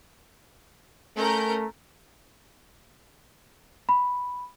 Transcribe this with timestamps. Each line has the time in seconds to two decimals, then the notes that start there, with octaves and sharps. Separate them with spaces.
1.17 A3 C#4 A#4 G6
3.89 B5